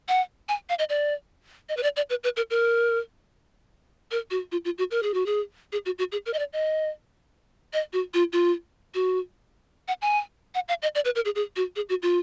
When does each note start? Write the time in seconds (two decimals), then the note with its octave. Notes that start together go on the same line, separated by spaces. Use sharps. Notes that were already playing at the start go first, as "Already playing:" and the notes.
0.09 F#5
0.49 G#5
0.69 F5
0.79 D#5
0.89 D5
1.69 D#5
1.77 B4
1.83 D5
1.97 D5
2.10 B4
2.24 B4
2.37 A#4
2.50 A#4
4.11 A#4
4.31 F#4
4.52 F4
4.65 F4
4.78 F#4
4.91 A#4
5.03 G#4
5.14 F#4
5.26 G#4
5.72 G#4
5.86 F#4
5.98 F#4
6.12 G#4
6.26 A#4
6.34 D#5
6.39 D5
6.53 D#5
7.73 D#5
7.93 F#4
8.14 F4
8.33 F4
8.95 F#4
9.88 F#5
10.02 G#5
10.55 F#5
10.69 F5
10.82 D#5
10.95 D5
11.05 B4
11.16 A#4
11.25 G#4
11.35 G#4
11.56 F#4
11.76 G#4
11.89 F#4
12.02 F4